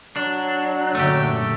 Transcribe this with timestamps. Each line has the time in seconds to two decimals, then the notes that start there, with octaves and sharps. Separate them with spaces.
0.16 F#3 D4
0.95 F#2 A#2 D3 A3 G4